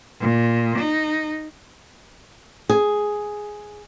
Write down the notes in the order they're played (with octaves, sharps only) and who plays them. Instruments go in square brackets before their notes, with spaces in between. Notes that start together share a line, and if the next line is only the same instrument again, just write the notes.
[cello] A#2
D#4
[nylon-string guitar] G#4